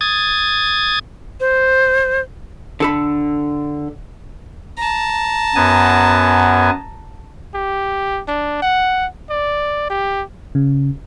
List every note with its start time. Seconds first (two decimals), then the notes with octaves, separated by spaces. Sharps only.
0.01 D#6 G#6 A6
1.40 C5
2.80 D3 A4 B5
4.77 A5 A#5
5.55 F#2 B3 G#5
7.54 G4
8.28 D4
8.62 F#5
9.30 D5
9.90 G4
10.55 C#3